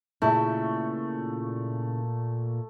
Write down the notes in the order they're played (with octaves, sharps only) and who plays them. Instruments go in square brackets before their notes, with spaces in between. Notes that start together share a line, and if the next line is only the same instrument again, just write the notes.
[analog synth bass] A#2 [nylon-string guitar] C#3 E4 [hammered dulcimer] A3